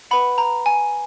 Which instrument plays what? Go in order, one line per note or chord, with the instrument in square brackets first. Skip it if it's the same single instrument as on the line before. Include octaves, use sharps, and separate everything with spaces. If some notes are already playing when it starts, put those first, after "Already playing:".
[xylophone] B4 F#5 B5
A#5
G#5